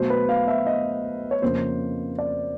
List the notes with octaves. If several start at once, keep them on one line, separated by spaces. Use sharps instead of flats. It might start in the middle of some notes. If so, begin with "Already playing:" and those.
Already playing: B2 F#3 A3 C5
B4
F5
E5
D#5
C#5
F2 C#3 F3 A#3 C5
D5